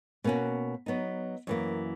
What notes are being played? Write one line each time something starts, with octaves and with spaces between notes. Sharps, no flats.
B2 A#3 C#4 F#4
F#3 B3 D#4
F#2 E3 A#3